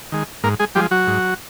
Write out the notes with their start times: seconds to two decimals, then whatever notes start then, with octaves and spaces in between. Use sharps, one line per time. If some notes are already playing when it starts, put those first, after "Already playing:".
0.12 D#3 G#3
0.43 G#2 A#3 A#4
0.59 G#3 G#4
0.75 F3 G3 G#3 G4
0.91 F#3 F#4
1.07 G#2